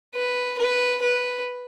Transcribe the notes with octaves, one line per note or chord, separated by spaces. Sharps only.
B4
B4
B4